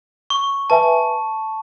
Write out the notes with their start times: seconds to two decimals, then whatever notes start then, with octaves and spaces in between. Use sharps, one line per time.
0.30 C#6
0.70 B4 E5 G#5 A5